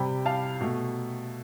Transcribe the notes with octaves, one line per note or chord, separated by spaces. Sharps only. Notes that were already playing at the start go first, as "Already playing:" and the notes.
Already playing: C3 G3 G5 B5
F5 A5
B2 A3